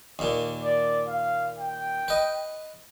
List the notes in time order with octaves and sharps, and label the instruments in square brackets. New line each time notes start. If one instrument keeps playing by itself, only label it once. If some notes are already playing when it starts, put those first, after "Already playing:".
[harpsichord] D#2 A#2
[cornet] D5
F5
G5
[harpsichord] B4 D#5